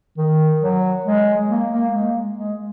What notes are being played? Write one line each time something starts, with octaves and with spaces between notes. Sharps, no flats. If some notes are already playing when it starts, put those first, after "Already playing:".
D#3
F#3
G#3
A#3
A#3
G#3
G#3